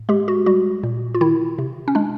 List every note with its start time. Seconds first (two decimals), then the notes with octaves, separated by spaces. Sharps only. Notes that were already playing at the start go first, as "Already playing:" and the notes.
Already playing: A2
0.09 G#3 G4
0.28 F#4
0.46 G3 F#4
0.83 A#2
1.14 F4
1.21 D#3 E4
1.58 C3
1.88 C#4
1.95 G#3 D4